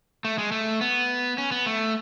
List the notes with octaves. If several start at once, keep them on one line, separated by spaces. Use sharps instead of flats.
A3
G#3
A3
B3
C#4
B3
A3